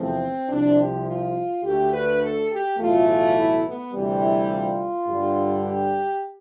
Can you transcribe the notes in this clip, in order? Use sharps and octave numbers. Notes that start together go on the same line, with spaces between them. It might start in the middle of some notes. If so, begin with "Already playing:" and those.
Already playing: E2 C3 F3 A3 C4
C2 C3 F3 D4
G4
F4
D2 D3 A3 G4
B4
A4
G4
B1 A2 E3 A3 F4
F4
E4
B3
D2 C3 E3 G3
E4
F4
G2 D3 G3
G4